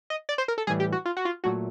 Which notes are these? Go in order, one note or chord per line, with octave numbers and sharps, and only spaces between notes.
D#5
D5
C5
A#4
A4
A2 E3 G3 G#4
G4
F#4
F4
F#4
F4
A#2 F#3 A3 F#4